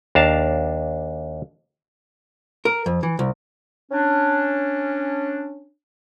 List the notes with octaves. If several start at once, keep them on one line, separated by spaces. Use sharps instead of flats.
D#2 D4 F5 A5 A#5
A#4
F2
E3
C2
C#4 D4